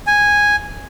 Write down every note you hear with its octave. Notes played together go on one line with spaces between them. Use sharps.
G#5